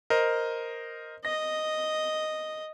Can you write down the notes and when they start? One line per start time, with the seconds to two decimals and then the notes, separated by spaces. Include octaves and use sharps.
0.10 A#4 C5 D#5
1.25 D#5 A#6